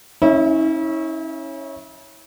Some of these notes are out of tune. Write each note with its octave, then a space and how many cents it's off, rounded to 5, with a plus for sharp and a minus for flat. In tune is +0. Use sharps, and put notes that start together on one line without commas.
C#4 -10 E4 -40 E5 +25